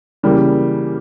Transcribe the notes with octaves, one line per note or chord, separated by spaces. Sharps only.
C#3 E3 G3 A#3